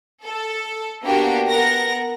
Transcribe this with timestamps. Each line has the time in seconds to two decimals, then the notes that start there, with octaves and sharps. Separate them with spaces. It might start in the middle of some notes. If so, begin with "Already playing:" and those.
0.23 A4
1.03 A#3 B3 D4 F#4 G4 G5
1.48 B3 A#4 F#5 A#6